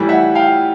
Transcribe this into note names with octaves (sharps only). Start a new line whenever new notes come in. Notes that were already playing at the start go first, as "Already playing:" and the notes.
Already playing: A2 E3 G3
E5 F#5
F5 G5